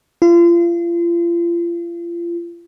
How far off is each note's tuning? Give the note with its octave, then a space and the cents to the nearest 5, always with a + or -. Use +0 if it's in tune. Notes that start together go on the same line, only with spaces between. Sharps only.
F4 -35